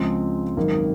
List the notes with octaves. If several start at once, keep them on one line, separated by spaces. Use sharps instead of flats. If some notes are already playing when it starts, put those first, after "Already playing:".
Already playing: C#2 C#3 F3 G#3 C4
G#1 F#2 D#3 A#3